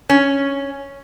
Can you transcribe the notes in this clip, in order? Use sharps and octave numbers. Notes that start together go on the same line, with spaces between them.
C#4